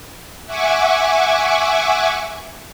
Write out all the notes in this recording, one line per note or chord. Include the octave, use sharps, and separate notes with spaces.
E5 F#5 G#5 C#6 D6